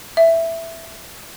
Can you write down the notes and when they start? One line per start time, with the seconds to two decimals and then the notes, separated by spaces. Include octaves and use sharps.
0.17 E5